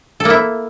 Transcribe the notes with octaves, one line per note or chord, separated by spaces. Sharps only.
A#3 E4 A4